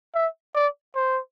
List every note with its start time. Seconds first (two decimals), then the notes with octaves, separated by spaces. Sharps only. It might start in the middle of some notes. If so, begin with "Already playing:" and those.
0.15 E5
0.55 D5
0.95 C5